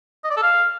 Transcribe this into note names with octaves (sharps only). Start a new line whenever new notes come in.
D#5
D5
A4
F5